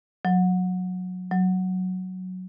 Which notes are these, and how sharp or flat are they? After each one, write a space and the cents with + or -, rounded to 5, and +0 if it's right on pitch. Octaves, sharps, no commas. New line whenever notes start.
F#3 -20
F#3 +0